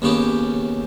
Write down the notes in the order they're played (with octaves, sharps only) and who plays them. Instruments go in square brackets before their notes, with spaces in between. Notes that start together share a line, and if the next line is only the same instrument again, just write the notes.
[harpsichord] D#2 C#3 B3 G4